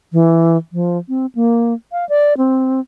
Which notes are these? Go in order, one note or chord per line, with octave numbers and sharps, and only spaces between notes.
E3
F3
C4
A#3
F5
D5
C4